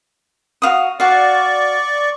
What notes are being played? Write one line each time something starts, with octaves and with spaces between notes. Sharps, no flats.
F#4 F5 D#6
F#4 D5 F5 C#6